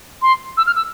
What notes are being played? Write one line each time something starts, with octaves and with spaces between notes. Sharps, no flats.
C6
E6
F6
E6